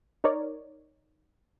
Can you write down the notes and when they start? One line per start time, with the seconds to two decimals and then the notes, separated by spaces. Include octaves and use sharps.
0.24 D#4 A#4 C#5 D5